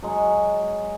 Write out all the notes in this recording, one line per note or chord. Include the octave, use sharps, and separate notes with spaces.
F#3 G#3